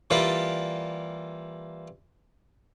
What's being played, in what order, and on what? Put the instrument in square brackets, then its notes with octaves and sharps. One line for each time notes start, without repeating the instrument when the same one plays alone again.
[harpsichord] E3 G3 A#3 E4 F4 D5